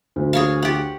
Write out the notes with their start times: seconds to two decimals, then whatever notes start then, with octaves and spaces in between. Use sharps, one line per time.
0.16 D2
0.33 G#4 C#5 F5
0.62 G4 F#5